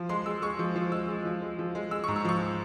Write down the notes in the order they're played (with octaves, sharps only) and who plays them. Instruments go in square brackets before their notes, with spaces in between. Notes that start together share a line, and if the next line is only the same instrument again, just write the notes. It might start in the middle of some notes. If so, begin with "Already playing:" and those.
Already playing: [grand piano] F3
G#3 C6
G#3 E6
G#3 C#6
F3
F3
G#3 E6
G#3
F3
G#3
F3
G#3
G#3 E6
C#6
G#2
E6
F3 C#6